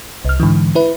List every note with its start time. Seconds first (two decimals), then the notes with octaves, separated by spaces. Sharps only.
0.25 C2 F6
0.40 G#2 D3 E3
0.75 E4 B4